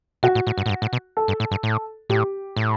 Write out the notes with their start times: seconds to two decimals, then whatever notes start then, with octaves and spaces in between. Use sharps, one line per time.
0.23 B2 F#4
0.35 A2
0.47 A2
0.58 G2
0.66 A2
0.70 G2
0.82 A2
0.93 B2
1.17 A4
1.28 G2
1.40 A2
1.51 G2
1.63 A2
2.10 A2 G4
2.56 A2